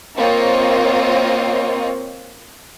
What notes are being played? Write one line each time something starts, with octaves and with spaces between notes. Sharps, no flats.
A#3 C4 F4 C#5 D#5